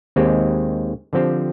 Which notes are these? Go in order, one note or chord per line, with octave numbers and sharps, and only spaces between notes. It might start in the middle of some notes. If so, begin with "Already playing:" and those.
D#2 D#3 G#3 C4 G4
D3 F3 C4 G4